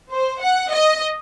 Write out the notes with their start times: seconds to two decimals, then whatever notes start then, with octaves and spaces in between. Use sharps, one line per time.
0.13 C5
0.42 F#5
0.73 D#5